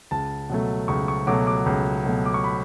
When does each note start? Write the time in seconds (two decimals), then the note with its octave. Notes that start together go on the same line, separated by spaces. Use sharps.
0.11 C#2 A5
0.50 B2 F#3 A3
0.88 C#2 C#6
1.08 C#6
1.27 B2 F#3 A3 D6
1.47 D6
1.66 C#2
2.05 B2 F#3 A3
2.25 D6
2.34 C#6
2.44 B5